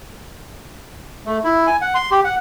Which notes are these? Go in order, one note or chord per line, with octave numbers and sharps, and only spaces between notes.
A3
E4
G#5
F#5
C6
G4
F#5